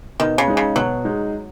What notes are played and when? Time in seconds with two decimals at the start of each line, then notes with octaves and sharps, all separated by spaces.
0.20 B2 D#3
0.38 C#3
0.48 G#3 D#4
0.57 C#3
0.76 B2 F#3
1.05 G#3 D#4